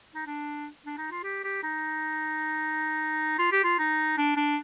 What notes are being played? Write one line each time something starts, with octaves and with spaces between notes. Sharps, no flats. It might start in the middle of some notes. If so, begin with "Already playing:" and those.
D#4
D4
D4
D#4
F4
G4
G4
D#4
F4
G4
F4
D#4
D4
D4